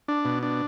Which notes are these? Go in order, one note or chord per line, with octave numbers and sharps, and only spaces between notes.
D4
B2
D4